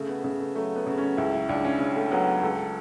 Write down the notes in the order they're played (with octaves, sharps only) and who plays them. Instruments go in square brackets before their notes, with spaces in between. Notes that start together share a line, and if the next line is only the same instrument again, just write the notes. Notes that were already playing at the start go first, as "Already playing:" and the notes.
Already playing: [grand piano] C#3 A3
B3
C#3 A3
A3
F#3 A3
B3
C#3
C#4
C#2 E4
E4
C#2 D4
C#4
C#3 C#4
A3
F#3 B3
C#2 A4